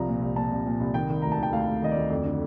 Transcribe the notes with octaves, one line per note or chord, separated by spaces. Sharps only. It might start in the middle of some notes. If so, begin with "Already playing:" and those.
Already playing: C2 F3 A#5
A#2
C2
A#2 A5
C2
A#2
C2
D#3 G5
D#3
D2 A#5
A5
D#3 G5
D2 F5
D2
D#3 D#5
D2 D5
F2
D3